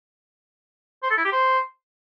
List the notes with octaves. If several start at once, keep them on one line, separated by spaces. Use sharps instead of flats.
C5
A4
E4
G4
C5